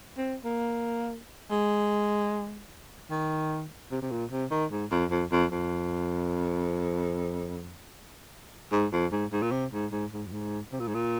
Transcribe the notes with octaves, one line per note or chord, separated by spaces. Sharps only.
C4
A#3
G#3
D#3
C3
C3
A#2
C3
D#3
G#2
F2
F2
F2
F2
G#2
F2
G#2
G#2
A#2
C3
G#2
G#2
G#2
F2
G#2
C3
A#2
G#2
A#2